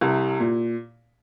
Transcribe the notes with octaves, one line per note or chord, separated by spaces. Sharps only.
C2 C3
A#2